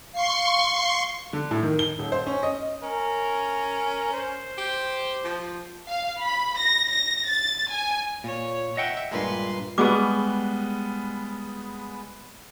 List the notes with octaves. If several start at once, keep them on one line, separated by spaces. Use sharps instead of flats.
F5 C6 C#6 C7
D3
A2
D#3
G7
D#1
C5
C#4
D#5
C#4 A#4
C5
G4
F3
F5
B5
A#6
A#6
A6
G#5
A#2 C#5
D#5 E5 F#5 G5
G2 A#2 G#3 B4 C6
G3 G#3 B3 G#4 D6